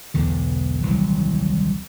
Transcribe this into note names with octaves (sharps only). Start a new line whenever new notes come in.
E1 B1 E2 D3
D#1 C2 E3 F#3